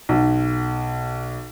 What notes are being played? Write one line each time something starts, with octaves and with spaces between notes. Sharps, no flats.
B1